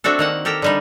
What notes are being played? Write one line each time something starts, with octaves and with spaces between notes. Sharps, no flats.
A3 C4 D4 F#4 A4
D#3 A#3 F#5
G4 A4 A#4 G5
D3 G3 D#4